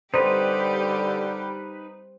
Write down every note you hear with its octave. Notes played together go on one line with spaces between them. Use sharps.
D3 G3 D#4 G4 B4 C5